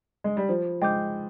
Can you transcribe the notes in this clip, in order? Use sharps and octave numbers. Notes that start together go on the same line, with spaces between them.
G#3
G3
F3 C5
G#3 G5 D6 G6